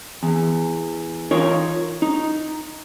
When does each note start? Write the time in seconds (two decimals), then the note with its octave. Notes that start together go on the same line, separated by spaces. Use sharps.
0.23 E2
1.31 D#4 F4 A#4 C#5
2.02 D#4